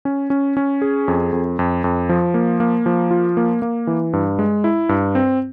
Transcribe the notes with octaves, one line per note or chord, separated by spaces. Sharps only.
C#4
C#4
C#4
G#4
F2
F2
F2
F2
F3
A#3
A#3
F3
F4
A#3
A#3
E3
G2
G#3
E4
G2
C4